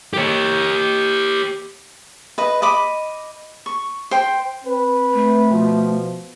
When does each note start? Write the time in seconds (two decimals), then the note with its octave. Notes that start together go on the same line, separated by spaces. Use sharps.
0.14 G4 C#5
2.38 B4 D#5
2.62 D#5 B5 D6
3.66 C#6
4.11 C5 G5
4.65 C4 B4
5.14 A3
5.50 B2 F3